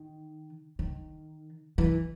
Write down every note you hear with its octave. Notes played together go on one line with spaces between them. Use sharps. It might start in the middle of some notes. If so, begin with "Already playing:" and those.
Already playing: D#3
D#3
E3